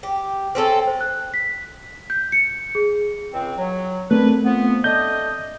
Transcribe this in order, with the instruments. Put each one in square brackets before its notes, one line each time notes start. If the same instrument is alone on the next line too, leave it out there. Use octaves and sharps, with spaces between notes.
[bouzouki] G4
C4 C#4 A4
[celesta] C5
F#6
B6
G6
C#7
G#4
[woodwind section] C#2 C4
F#3
[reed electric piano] A3 C4 [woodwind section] D4 A#4 B4
[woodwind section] F3 B3
[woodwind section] A3 D4 D#5 [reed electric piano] G6